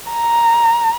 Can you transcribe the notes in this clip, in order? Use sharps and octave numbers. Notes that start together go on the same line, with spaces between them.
A#5